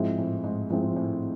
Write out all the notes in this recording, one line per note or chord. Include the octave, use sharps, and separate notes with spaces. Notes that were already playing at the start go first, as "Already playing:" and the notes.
Already playing: G#2 F3 G#3 C4 E4
A2
G#2
G#2 F3 G#3 C4 E4
A2